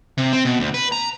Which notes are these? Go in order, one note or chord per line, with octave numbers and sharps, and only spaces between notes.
C3
C4
B2
D2
B4
A#5